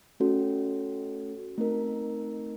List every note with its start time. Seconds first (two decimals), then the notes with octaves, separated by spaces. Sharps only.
0.20 A3 C#4 F#4 A4
1.58 A3 C4 D#4 A#4